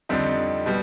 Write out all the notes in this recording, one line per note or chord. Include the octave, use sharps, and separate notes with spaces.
F2 D3 G3 C4 D#4
B2 G3